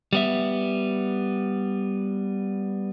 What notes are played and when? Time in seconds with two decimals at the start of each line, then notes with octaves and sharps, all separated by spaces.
0.13 G3 B3 E5